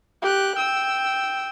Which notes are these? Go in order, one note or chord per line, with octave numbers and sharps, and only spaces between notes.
G4 F#6
G5 E6